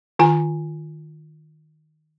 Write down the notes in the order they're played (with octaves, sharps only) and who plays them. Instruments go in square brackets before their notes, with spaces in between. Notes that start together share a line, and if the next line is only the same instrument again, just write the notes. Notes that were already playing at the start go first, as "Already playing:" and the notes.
[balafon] D#3 F4 G#5